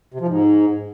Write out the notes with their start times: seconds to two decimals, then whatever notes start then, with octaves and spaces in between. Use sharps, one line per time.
0.14 C3
0.21 F3
0.28 G#2